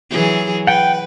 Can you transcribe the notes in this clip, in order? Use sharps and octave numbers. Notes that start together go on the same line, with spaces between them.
E3 F#3 G#4
B4 F#5 G5